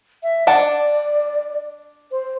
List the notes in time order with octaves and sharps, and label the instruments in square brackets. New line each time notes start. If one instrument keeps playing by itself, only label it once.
[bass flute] E5
[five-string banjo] D4 F#5 A5 [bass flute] D5
[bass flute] C5